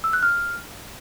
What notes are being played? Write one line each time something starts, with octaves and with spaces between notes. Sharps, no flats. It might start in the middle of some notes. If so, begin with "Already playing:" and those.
E6
F#6
F6